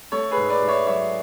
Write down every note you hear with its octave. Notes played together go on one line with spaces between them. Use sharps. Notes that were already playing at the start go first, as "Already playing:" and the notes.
A3 A4 C#5
G#4 B4
G#2
B4 D5
G#2
C#5 E5
F#3 C#5 E5